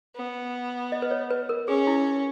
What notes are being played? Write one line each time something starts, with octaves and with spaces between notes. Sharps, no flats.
B3
D#5
B4
C#5
B4
A#4
C#4 G#4
E4